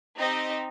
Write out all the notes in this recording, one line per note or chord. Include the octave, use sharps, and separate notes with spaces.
C4 D#4 G4 D#5